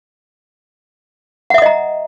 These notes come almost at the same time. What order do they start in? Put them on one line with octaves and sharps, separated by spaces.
F#5 E5 D#6 D#5 A#5